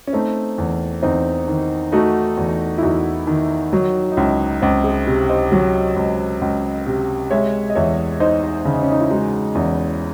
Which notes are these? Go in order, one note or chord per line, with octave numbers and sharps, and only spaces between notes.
C#4
A3 C4 D#4
E2
E2 C4 D#4
D#3
A3 D#4 F#4
E2
E4
E2 D#4 F#4
D#3
F#3 D#4 F#4
D#4
C#2 C#4 E4
C#2 C4 D#4
G#4 C5
C3
C5 D#5
F#3
C#2
C#2
C3
G#3 C#5 E5
D#5
E2 C#5 E5
D#4 C5 D#5
C#3
C#4
D#4
E4
G#3 D#4 F#4
E2 C#4 E4